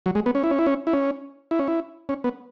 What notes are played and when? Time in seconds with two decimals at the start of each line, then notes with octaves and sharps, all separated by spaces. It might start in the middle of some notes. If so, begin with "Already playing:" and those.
0.06 F#3
0.15 G#3
0.26 B3
0.35 C#4
0.44 E4
0.51 C#4
0.59 E4
0.66 C#4
0.87 E4
0.93 C#4
1.51 E4
1.59 C#4
1.67 E4
2.09 C#4
2.24 B3